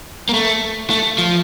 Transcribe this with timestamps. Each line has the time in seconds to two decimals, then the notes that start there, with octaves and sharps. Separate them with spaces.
0.29 A#3
0.34 A3
0.90 A3
1.18 F3